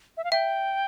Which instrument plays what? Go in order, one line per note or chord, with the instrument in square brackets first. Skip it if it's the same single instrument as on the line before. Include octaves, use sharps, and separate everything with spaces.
[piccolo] E5
F5
[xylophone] E5 [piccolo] G5